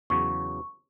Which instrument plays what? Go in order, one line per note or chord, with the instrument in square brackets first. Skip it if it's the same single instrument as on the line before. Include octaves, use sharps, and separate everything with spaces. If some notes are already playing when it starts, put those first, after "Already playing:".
[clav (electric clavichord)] E2 C#3 F#3 [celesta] C#6